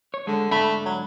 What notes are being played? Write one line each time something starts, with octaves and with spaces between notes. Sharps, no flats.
C#5
D3 G#3
G#2 D3 A3 B5
F#3